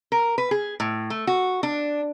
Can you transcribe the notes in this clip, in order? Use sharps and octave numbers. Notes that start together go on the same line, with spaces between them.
A#4
B4
G#4
A2
A3
F#4
D4